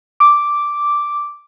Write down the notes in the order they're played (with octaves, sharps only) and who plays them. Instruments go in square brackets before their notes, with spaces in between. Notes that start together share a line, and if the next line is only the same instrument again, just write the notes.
[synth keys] D6